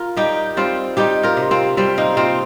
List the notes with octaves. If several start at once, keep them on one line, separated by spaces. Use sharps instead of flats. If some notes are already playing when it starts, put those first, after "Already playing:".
Already playing: F4 A#4
G3 D#4 G4
G3 C4 F4
G3 D#4 G4
F4 A#4
C3
C4 F4
C3 G3 C4
A#3 D#4
C3 C4 F4